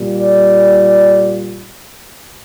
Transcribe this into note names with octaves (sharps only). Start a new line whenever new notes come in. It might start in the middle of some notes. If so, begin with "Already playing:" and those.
Already playing: A#2 G3
D5